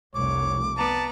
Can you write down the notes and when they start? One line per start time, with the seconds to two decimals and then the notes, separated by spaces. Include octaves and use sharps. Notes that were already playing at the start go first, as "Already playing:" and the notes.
0.14 F1 C2 C#5 D6
0.77 B3 D5 A5 A#5